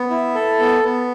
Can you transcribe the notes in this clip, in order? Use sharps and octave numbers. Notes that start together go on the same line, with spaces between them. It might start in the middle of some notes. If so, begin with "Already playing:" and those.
Already playing: B3
E4
A4
B3
B3